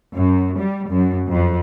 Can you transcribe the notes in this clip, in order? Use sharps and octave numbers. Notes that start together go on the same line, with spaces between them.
F#2
G3
F#2
F2